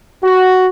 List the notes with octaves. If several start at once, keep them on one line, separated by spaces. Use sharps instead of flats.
F#4